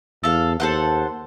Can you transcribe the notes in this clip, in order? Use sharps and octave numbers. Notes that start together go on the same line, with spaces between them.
E2 A4 F5
D#2 A4 C5 F#5